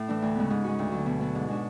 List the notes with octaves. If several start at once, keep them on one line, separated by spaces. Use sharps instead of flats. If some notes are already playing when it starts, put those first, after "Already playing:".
Already playing: A2
E3 A3 D4
D2
C#3 G#3 B3
G#2
G#3 C#4 F#4
D2
D3 F#3
B2
F#3 B3
G#2
G#3 D4 F#4